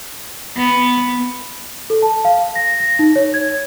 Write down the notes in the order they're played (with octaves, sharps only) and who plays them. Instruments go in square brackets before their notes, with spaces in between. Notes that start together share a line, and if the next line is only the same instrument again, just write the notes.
[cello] B3
[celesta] A4
A5
F5
A#6
A#6
D#4
C#5
G#6